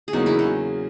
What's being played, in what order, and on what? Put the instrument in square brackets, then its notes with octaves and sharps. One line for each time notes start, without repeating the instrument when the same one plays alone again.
[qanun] G#4
[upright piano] E2 C#3 F#3 A#3 [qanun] D#4 F#4
[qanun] E4 G#4
D#4 F#4